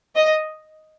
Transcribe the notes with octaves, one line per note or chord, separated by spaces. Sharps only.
D#5